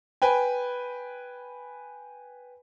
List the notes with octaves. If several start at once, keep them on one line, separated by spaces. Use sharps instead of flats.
B4 G5 G#5